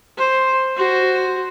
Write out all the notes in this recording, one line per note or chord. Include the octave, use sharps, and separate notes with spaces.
C5
F#4 C5